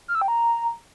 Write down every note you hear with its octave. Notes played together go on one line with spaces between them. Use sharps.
F6
E6
G5
A#5